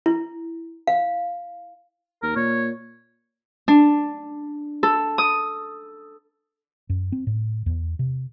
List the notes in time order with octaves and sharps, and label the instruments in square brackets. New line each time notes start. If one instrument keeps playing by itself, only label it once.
[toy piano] E4
F5
[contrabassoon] D#2 [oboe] A#4
[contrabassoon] A#2 [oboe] C#5
[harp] D4
A4
D#6
[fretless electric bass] F#2
C4
A2
E2
C3